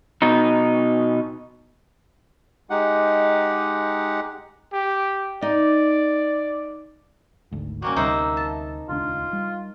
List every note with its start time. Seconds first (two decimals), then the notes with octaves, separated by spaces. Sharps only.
0.22 B2 D#4
2.70 G#3 D#4 G4 F#5
4.72 G4
5.42 D#4 D5
7.51 G#1 D2 G#2
7.82 G3 A#3 C#4 F#4
7.96 D2 C3 G3 D#4 C5 E5 F#5
8.37 A5
8.89 D#1 C#2 D4 F4
9.33 G3